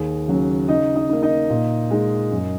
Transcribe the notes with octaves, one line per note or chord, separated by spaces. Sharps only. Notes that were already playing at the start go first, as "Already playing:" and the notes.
Already playing: D#2 G#4
C#3 F#3 C#4
C#3 D#4 D#5
D#4 D#5
A#3 D#4
D#4 D#5
A#2
G#3 D#4
F#2